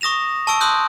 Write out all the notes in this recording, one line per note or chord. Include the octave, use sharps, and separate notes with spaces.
C#6 D#6 A#6 E7 F7
A5 C#6 E6 D7
C6 D#6 E6 F#6 G6